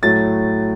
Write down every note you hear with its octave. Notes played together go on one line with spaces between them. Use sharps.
A2 F#3 A3 A6